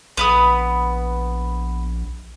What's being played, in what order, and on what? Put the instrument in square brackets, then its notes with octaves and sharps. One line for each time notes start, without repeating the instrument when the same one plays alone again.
[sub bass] A#1 [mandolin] B3 B4 D#6